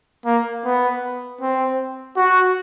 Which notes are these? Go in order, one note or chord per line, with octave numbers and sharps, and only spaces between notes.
A#3
B3
C4
F#4